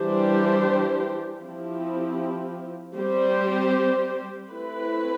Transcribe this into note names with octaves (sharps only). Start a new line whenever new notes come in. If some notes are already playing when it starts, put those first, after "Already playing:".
Already playing: E3 G3 D4 G4 C5
F3 C4 E4 G4
G3 C4 G4 C5
A3 C4 E4 B4